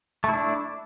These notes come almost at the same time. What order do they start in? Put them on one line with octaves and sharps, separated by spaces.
A3 E4 D4